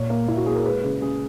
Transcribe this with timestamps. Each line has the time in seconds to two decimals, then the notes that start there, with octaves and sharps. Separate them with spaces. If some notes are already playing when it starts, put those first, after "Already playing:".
Already playing: A#2 C#5
0.10 A#3
0.27 A#2 E4
0.37 F#4
0.46 A#3 G#4
0.55 A#4
0.65 G#3 B4
0.84 C#3
1.02 C#3 G#4